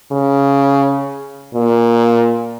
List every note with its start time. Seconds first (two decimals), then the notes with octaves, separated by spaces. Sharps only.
0.12 C#3
1.55 A#2